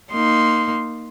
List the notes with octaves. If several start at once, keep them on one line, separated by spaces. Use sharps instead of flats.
A#3 D#4 C6